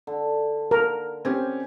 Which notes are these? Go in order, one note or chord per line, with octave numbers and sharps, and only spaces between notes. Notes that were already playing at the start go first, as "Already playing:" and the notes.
D3
A#4
C4 C#4 G4 G#5